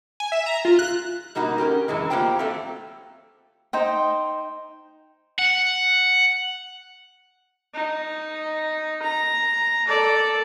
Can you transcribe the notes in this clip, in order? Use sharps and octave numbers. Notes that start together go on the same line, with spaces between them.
G#5
E5
A#5
F4
F#6
B2 G3 A#3 D#4 F#4
C#4 G4 A#4
F#2 C3 E3 G#3
A#3 B3 F4 G4 C5 G5
F#3 A3 C4
D#4 C5 G5
F#5
D#4
A#5
A4 D5